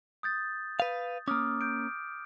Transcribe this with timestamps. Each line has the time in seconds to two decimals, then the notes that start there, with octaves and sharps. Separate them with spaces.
0.23 D#6 G6 A6
0.80 B4 F5
1.28 A#3 C#4 D6 D#6 F6
1.61 G6 D7